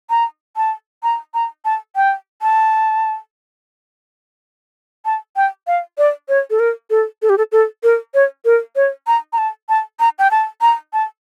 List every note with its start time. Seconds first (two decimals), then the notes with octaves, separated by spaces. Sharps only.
0.10 A#5
0.57 A5
1.03 A#5
1.34 A#5
1.65 A5
1.96 G5
2.42 A5
5.05 A5
5.36 G5
5.67 F5
5.98 D5
6.29 C#5
6.50 A4
6.60 A#4
6.90 A4
7.22 A4
7.30 G4
7.38 A4
7.52 A4
7.83 A#4
8.14 C#5
8.45 A#4
8.76 C#5
9.07 A#5
9.33 A#5
9.38 A5
9.69 A5
10.00 A#5
10.19 G5
10.31 A5
10.61 A#5
10.93 A5